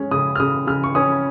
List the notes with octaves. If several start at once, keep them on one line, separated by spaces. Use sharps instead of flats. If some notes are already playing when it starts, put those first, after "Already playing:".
Already playing: G#3 C#4
C#3 D#6
F6
C#3 D#6
C#3 F6
C#6
C#4 D#6